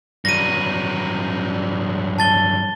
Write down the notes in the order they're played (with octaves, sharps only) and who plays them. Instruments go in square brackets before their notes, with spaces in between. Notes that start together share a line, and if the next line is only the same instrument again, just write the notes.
[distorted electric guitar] G2 F#3 [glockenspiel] A#6 D#7
[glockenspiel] A5 A6 G7